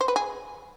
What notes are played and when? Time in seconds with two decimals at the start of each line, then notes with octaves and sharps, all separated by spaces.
0.01 C5
0.08 B4
0.16 G#4